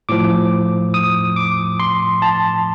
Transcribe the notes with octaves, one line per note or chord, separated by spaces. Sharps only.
A2 F3 D6
D#6
D6
C6
A5